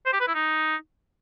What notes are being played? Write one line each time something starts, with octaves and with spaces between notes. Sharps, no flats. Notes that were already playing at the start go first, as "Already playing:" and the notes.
C5
G4
B4
E4
D#4